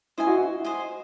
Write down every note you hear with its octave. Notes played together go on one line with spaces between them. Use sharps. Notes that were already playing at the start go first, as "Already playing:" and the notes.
E4 C5 D#5 G#5
F#4
E4
C5 D#5 G#5